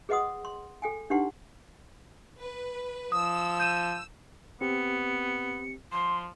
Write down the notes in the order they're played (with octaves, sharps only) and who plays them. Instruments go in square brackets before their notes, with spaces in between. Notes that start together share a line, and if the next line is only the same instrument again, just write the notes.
[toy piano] G#4 B4 D#5 F#5 C6 D#6
C6
A4 G5 G#5
D4 D#4 G4 B4 F#5 C6
[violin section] B4
[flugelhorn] F3 [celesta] D#6 [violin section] E6
[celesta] G6 D#7 E7
[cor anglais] B3 [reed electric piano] C4 G4 [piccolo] C#7
[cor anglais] F3 [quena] C6